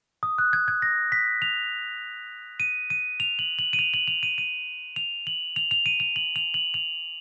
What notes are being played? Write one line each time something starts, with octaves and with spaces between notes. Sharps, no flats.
D#6
F#6
G#6
G#6
A#6
B6
F7
D#7
D#7
F7
F#7
F#7
D#7
F7
F#7
F7
D#7
D#7
F7
F#7
F7
F7
D#7
F7
F#7
F7
F#7
F7